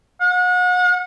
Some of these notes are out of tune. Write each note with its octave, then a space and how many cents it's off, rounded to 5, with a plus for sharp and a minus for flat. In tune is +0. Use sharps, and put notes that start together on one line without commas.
F#5 -35